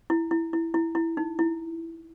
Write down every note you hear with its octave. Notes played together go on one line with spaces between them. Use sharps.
E4
E4
E4
E4
E4
D#4
E4